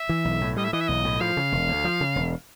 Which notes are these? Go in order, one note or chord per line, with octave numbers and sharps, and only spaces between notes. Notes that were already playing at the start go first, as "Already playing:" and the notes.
Already playing: E5
E3
B1
A2
G3 D#5
E5
E3 D#5
E5
B1 D#5
A2
F3 F5
C#3
E1
D2
F3
C#3
E1